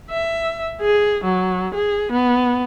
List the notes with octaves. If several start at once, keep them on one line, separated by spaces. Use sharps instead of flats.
E5
G#4
F#3
G#4
B3